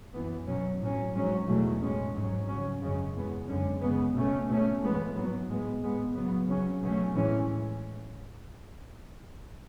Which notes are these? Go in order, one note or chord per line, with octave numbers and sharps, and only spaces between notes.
F#2 E3 B3
B2 F#3 C#4
A2 F#3 C#4
G#2 F#3 C#4
E2 B2 F#3 A3
A2 G#3 C#4
G#2 F#3 C#4
C#3 F#3 C#4
F#2 C#3 G#3 C#4
E2 B2 G#3 B3
F#2 D3 G#3 C#4
C#3 G#3 B3
B2 A3 C#4
B2 A3 C#4
A2 E3 G#3 B3
G#2 F#3 B3
A2 G#3 B3
A2 G#3 B3
C#3 F#3 B3
C#3 F#3 C#4
B2 F#3 A3 C#4
A2 E3 G#3 C#4